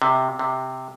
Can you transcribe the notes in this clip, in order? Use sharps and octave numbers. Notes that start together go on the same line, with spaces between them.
C3
C3